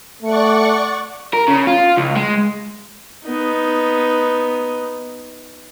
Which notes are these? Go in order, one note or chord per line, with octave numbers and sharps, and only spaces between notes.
A3 D5 F#5 C#6
A#4
C#3
F4
C#2
G#3
B3 D#4